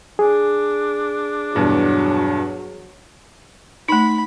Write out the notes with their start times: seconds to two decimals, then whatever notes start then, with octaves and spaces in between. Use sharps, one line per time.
0.19 D4 G#4
1.55 E2 G2 B2 F#3
3.88 A3 D#4 B5